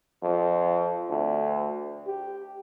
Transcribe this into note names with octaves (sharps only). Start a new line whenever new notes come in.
F2
D2
G4